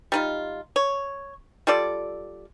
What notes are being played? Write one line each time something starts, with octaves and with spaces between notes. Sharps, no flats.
G3 D#4 F4
C#5
G3 F4 A4 D5